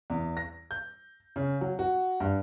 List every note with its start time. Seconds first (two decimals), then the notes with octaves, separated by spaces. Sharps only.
0.10 E2
0.37 A#6
0.71 G6
1.36 C#3
1.61 F#3
1.79 F#4
2.20 G2